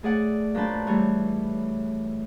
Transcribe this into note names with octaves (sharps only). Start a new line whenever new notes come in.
A3 G#4 D5 F#5
A#2 F#3 D4 B4 C5 A5
E3 G3 A3 C#5